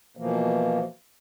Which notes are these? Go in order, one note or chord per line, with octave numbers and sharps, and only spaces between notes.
B2 E3 F3 A#3